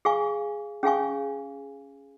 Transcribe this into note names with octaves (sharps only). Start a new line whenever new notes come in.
G#4 F5 G#5 C#6
C#4 G#4 F5 G#5 C#6